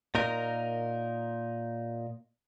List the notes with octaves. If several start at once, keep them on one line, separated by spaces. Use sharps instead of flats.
A#2 D#4 A#4